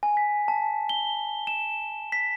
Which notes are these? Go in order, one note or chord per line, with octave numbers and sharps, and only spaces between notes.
G#5
B6
A5
G7
E7
B6